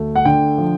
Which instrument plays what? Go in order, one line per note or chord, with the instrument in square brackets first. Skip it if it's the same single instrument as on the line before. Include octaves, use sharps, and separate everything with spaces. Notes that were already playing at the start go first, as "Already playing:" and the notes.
Already playing: [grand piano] D2 A3
F#5
D3 G5
F3